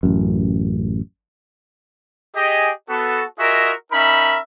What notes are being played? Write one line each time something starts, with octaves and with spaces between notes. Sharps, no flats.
A1 F#2
G4 G#4 D#5
B3 F#4 A4
F4 F#4 G#4 A#4 D#5 E5
C#4 D#4 A#4 E5 B5